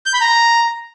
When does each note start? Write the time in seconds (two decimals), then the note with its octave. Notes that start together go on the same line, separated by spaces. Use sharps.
0.06 G6
0.13 B5
0.21 A#5